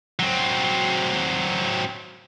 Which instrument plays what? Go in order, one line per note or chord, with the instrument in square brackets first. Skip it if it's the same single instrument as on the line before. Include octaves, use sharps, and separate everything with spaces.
[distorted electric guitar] F#3 C4